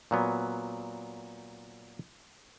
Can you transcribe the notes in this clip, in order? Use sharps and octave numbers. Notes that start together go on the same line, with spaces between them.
A#2 F#3 B3